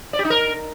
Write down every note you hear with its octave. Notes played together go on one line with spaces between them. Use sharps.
D5
G4
D#4
A#4